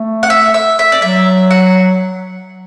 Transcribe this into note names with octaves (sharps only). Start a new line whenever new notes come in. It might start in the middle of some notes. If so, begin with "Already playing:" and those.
Already playing: A3
F#5
E5
E5
E5
D5
F#3 E5
F#5